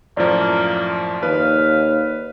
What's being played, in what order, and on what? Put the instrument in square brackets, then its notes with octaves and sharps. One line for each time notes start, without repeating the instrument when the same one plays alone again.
[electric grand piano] F#2 A2 F3 [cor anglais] A#3 [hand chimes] D5
[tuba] D#2 [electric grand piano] B4 [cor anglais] F5